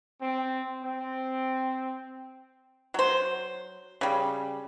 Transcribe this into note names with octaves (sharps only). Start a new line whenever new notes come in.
C4
C4
F#3 C5
C#3 G3